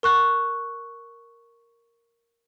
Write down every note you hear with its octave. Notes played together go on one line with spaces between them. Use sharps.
A#4 C#6 F#6